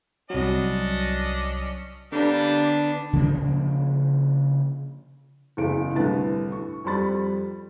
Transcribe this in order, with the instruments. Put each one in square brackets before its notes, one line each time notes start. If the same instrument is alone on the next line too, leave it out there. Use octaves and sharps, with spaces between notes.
[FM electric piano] C2 F#3 [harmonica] C#4 D4 D#5
[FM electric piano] D3 [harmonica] G3 A#3 G4 [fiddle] B3 D4
[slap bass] C#3 F3 A#3 D4
[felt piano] F#1 E2 C#3 D7
C2 A2 D3 B4 A6
C#6
F2 G3 B5 A6